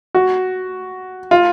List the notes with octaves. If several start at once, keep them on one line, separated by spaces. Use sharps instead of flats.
F#4
F4